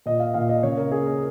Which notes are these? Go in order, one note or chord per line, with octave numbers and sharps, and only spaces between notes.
A#2 D#5
F5
A#2 F5
D#5
C#3 C#5
A#4
A#3 G#4
A#4